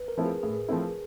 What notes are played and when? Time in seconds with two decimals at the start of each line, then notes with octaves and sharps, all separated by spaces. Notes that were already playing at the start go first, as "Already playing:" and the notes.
Already playing: B4
0.08 A#4
0.17 F3 A3 C4 E4
0.26 G#4
0.43 A2 G#4
0.69 F3 A3 C4 E4